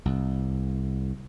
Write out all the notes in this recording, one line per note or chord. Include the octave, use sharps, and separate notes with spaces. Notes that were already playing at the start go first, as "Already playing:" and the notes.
C2